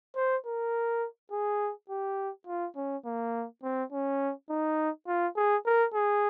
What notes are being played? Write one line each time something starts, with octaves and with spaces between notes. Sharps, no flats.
C5
A#4
G#4
G4
F4
C#4
A#3
C4
C#4
D#4
F4
G#4
A#4
G#4